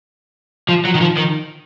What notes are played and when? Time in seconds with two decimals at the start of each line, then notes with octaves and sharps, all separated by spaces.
0.69 F3
0.85 F#3
0.95 D#3
1.01 F3
1.17 D#3